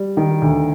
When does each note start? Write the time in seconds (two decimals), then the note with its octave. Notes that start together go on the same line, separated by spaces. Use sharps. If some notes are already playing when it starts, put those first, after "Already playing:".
Already playing: G3
0.17 D#3
0.42 D2